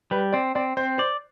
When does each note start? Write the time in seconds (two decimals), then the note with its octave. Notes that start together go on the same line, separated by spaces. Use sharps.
0.11 G3 B4
0.32 C4 D5
0.55 C4 D5
0.77 C4 C5
0.98 C5 D5